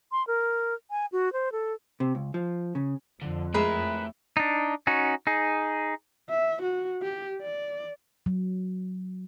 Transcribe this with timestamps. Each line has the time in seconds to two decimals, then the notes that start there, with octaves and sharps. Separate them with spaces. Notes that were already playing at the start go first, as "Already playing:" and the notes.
0.12 C6
0.27 A#4
0.91 G#5
1.12 F#4
1.33 C5
1.52 A4
2.00 C3
2.15 C#2
2.34 F3
2.75 C#3
3.22 F2 D3
3.54 A2 G#3 G#4 A#4 B4 E5
4.37 D4 D#4
4.87 C#4 D#4 F#4
5.27 D#4 G#4
6.30 E5
6.62 F#4
7.02 G4
7.41 D5
8.26 F#3